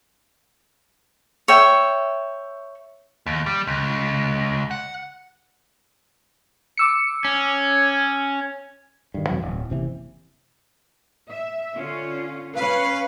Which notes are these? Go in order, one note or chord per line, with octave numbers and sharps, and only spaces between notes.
C#5 E5 G5
D#2
G3
C#2
F#5
D6 E6 C#7
C#4
G2 D#3
F2 B2 E3 F#3
D1
F#1 C3 E3
E5
D3 C#4 F4
C#4 B4 F5